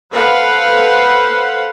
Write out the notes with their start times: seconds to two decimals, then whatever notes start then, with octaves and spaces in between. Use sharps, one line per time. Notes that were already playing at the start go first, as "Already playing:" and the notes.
0.12 A4 B4 C5 F5 F#5